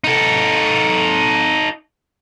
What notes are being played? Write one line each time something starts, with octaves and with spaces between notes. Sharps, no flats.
D#4 A4